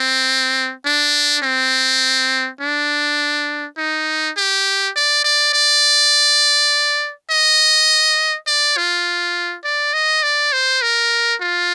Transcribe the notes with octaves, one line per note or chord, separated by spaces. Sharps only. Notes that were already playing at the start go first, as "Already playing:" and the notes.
Already playing: C4
D4
C4
D4
D#4
G4
D5
D5
D5
D#5
D5
F4
D5
D#5
D5
C5
A#4
F4